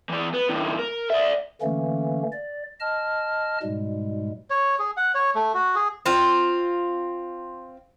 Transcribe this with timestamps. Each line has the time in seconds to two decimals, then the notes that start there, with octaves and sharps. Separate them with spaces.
0.10 E3 D5
0.34 B3
0.49 D#2 A2
0.79 A#4
1.10 D5 E5
1.62 D3 E3 A3 A#3 C#4
2.32 D5
2.80 D#5 A5 F6
3.62 G#2 B2 G3 G#3
4.50 C#5
4.79 G#4
4.97 F#5
5.15 C#5
5.35 A3
5.54 F#4
5.76 G#4
6.06 C4 F4